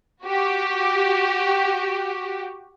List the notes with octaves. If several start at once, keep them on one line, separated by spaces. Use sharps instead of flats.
F#4 G4